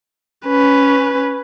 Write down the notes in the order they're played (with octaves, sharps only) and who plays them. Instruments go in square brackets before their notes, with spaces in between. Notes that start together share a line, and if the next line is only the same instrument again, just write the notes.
[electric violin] C#4 B4